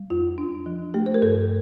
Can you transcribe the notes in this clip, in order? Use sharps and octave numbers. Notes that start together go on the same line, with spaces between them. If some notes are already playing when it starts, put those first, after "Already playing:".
Already playing: G3
F2 F4
D4
F3
A3 G4
C5
A#4
G2 A4